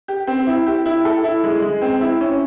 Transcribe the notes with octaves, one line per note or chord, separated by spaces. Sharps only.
G4
C4
E4
G4
E4
A4
E4
G#3
G#3
C4
E4
C#4